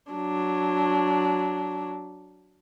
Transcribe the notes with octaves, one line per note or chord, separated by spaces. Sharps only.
F#3 D4